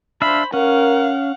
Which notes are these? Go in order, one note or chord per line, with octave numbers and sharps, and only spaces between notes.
D4 C5 E5 F5 B5
C#4 A#4 F5 F#5